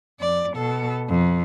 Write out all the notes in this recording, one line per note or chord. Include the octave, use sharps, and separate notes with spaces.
F2 D5
B2 A4
F2